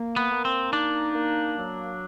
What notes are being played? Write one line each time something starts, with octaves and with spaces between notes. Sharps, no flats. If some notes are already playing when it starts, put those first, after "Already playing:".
Already playing: A#3
B3
A#3
C4
D4 D#4
A#3
F#3